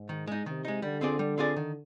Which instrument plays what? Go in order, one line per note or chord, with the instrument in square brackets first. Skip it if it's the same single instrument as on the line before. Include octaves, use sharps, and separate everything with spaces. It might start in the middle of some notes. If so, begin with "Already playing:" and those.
Already playing: [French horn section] G#2
[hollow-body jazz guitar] D#3
G#3 D#4
[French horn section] C3 [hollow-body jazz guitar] D#3
[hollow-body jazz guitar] G#3 D#4
[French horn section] D3 [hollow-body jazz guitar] G3
[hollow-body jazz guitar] C4 F4 G#4 D5
G3
C4 F4 G#4 D5
D#3